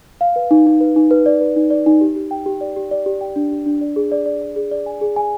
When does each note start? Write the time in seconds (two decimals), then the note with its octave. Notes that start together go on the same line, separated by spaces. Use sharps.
0.21 F5
0.36 B4
0.51 D#4
0.66 D#4
0.81 B4
0.96 D#4
1.11 B4
1.26 D5
1.41 B4
1.56 D#4
1.71 D5
1.86 D#4
2.01 G4
2.16 G4
2.31 G5
2.46 G4
2.61 D5
2.76 G4
2.91 D5
3.06 G4
3.21 G5
3.36 D4
3.51 G4
3.66 D4
3.81 D5
3.96 G#4
4.12 D5
4.26 D5
4.41 D5
4.56 G#4
4.71 D5
4.86 G#5
5.01 G#4
5.16 G#5